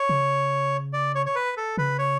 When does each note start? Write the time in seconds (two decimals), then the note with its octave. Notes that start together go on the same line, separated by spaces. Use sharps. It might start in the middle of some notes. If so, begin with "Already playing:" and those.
Already playing: C#5
0.09 C#3
0.93 D5
1.15 C#5
1.26 C#5
1.36 B4
1.57 A4
1.77 C#3 B4
1.99 C#5